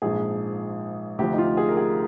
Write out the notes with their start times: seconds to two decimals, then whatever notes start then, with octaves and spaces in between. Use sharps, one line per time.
0.02 A#1 G#2 F3 G#4
1.18 D2 C3 F3 G4
1.33 D#4
1.38 F4
1.57 G#4
1.69 A#4
1.77 G#4